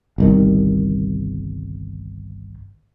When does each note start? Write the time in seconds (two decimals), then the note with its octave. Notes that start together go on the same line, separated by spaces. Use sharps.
0.18 G1 C2 D#3